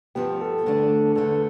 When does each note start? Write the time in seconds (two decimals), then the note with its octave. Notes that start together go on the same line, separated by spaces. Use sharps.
0.15 G2 F3 B3 G4
0.41 A4
0.66 D2 D3 A3 D4
1.15 E2 D3 A3 A4